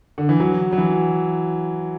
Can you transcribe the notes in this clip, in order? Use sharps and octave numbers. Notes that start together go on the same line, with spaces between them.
D3
E3
F#3
F#3
E3